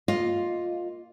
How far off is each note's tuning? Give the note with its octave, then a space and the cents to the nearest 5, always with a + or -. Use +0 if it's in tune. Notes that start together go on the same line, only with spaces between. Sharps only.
A#3 +0 F4 +5 D#5 +0